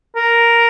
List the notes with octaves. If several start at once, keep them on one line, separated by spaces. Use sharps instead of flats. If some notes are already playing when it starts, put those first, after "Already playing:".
A#4